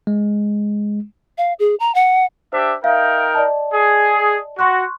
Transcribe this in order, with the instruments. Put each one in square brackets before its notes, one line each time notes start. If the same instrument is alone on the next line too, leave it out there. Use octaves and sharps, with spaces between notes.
[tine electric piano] G#3
[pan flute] F5
G#4
A#5
F#5
[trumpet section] D4 G4 E5 [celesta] C5
[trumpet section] D#4 A#4 G5 [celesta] E5 F5
[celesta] D5 D#5 A5
[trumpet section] G#4
[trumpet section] F#4 [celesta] C6 C#6 F#6